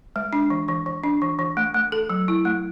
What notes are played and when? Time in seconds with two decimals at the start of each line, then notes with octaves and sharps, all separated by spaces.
0.16 G#3
0.33 D4
0.50 E3
0.68 E3
0.86 E3
1.04 D4
1.22 E3
1.39 E3
1.57 A3
1.74 A3
1.92 A4
2.10 F#3
2.28 E4
2.45 A3